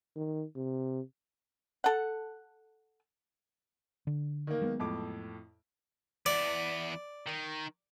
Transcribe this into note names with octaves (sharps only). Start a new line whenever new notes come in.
D#3
C3
A4 F#5
D3
D#3 A#3
F#3 G#3 B3
F2 A2 D6
E2 B3 D5
D#3